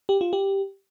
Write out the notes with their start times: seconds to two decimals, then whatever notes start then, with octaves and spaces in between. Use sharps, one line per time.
0.09 G4
0.21 F4
0.33 G4